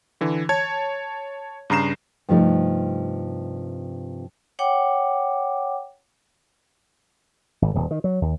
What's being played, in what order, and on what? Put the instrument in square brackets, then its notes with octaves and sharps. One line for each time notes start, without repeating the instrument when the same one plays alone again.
[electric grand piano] D3 E3
C#5 A5 G#6
G2 C#3 A#5 C7 E7
[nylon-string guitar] G2 C3 F3 A3 C#4 D#4
[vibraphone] C#5 F#5 G5 D6
[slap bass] G#1
D#1
D#3
F#3
D#2